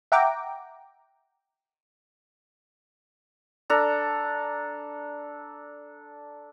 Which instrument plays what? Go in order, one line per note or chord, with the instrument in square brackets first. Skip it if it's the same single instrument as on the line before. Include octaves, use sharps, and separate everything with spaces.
[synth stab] E5 F#5 G5 A#5 D6
[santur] D4 A4 A#5